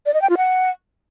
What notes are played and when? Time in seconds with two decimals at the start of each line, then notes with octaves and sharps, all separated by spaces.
0.06 D5
0.14 D#5
0.22 G5
0.30 F4
0.37 F#5